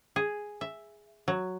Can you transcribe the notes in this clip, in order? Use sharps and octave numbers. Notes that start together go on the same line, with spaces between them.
G#4
E5
F#3